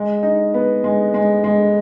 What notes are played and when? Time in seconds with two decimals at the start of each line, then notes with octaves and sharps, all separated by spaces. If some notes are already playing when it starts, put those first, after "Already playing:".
Already playing: G#3
0.23 D#4
0.54 B3
0.84 G#3
1.14 G#3
1.44 G#3